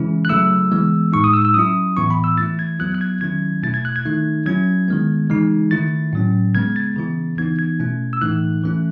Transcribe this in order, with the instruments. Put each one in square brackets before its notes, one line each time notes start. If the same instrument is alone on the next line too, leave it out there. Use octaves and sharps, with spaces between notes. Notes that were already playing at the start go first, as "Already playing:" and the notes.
Already playing: [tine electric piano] C#3 E3 G#3 C#4 E4
F#6
C#3 F#3 A3 E4 E6
E3 G#3 B3
A2 G#3 D#4 C#6
D#6
E6
E6
F#3 C#4 E4 D#6
A2 E3 B3 E4 C#6
B5
E6
E3 A3 E4 A6
G#6
F#3 B3 E4 F#6
F#6
G#6
D#3 F#3 C#4 E4 G#6
B2 A3 E4 A6
G#6
F#6
G#6
D#3 A3 D#4
F#3 C#4 E4 G#6
D#3 G#3 B3
C#3 E3 G#3 D#4
D#3 A3 E4 A6
A2 F#3 C#4
C#3 G#3 B3 G#6
A6
C#3 E3 B3 E4
E3 B3 D#4 G#6
G#6
B2 A3 C#4 E4
E6
A2 E3 A3 D#4 F#6
E3 A3 C#4 E4